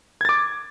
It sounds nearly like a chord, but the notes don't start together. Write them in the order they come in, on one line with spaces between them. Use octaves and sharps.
G#6 A6 D6